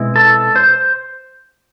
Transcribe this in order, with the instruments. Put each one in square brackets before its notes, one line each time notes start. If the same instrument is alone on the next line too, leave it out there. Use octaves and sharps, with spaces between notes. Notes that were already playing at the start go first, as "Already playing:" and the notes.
Already playing: [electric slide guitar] B2 G#3 C4 E4
A4
C5